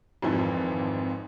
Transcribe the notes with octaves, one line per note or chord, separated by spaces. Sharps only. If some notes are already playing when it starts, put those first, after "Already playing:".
G#1 F2 G#2 E3 F3